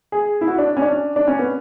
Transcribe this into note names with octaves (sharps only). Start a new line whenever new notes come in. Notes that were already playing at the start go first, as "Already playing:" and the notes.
G#4
E4
F#4
D4
C#4
D4
D4
C#4
B3